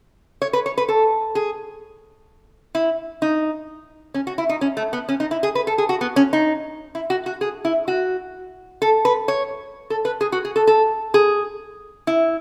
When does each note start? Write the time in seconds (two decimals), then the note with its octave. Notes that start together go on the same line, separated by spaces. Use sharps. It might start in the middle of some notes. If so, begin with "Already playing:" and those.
0.42 C#5
0.53 B4
0.66 C#5
0.78 B4
0.88 A4
1.35 G#4
2.75 E4
3.22 D#4
4.14 C#4
4.27 F#4
4.38 E4
4.49 D#4
4.61 C#4
4.77 A3
4.93 B3
5.09 C#4
5.20 D#4
5.31 E4
5.43 G#4
5.55 B4
5.67 A4
5.78 G#4
5.89 F#4
6.01 B3
6.16 C#4
6.33 D#4
6.95 E4
7.10 F#4
7.26 F#4
7.41 G#4
7.65 E4
7.88 F#4
8.82 A4
9.05 B4
9.28 C#5
9.90 A4
10.05 B4
10.21 G#4
10.32 F#4
10.45 G#4
10.56 A4
10.67 A4
11.14 G#4
12.07 E4